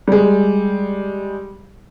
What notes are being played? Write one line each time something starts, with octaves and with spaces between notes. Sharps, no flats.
G3 G#3